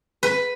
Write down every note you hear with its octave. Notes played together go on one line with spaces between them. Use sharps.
B4